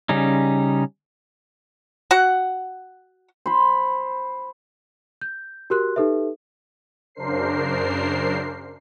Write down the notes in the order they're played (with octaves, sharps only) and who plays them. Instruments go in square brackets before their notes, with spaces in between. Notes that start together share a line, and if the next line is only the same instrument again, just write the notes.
[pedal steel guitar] C#3 G3 C#4 D#4
[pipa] F#4 F#5
[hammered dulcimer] C5 B5
[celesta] G6
F#4 G4 A#4 C6 F#6
D#4 G4 A4 B4 E5
[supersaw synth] F#2 C#3 D4 A#4 C5 C7